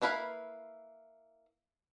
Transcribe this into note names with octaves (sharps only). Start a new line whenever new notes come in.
A#3 D4 E4 B4 F5